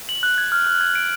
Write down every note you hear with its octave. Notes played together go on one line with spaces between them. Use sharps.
F#7
F#6
G#6
F6
F6
G#6
D7